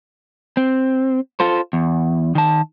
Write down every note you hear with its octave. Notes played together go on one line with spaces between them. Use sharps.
C4
F4 A4 C5
E2
D#3 A5